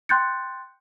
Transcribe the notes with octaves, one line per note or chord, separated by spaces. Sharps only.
G5 C6 F#6 G6 A6 C#7